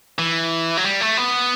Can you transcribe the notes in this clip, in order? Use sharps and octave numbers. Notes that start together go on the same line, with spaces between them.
E3
F#3
G3
A3
B3